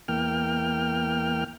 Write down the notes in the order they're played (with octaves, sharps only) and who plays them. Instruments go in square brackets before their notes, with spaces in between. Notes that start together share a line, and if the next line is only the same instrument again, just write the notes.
[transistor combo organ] E2 A#3 G5 F6